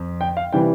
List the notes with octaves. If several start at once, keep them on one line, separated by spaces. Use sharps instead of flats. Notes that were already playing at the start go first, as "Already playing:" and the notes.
Already playing: F2
G5
F5
C3 E3 G3 G5